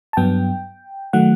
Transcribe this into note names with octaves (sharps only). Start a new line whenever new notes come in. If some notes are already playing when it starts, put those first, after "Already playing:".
A5
G2 F#3 B3 G5
D#3 F#3 A3 F#5